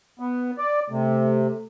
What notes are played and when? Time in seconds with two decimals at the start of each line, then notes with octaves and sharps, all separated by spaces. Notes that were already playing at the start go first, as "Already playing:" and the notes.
0.19 B3
0.58 D5
0.90 C3 A3